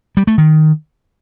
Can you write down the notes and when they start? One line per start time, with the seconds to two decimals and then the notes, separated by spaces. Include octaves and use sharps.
0.17 G3
0.27 A3
0.38 D#3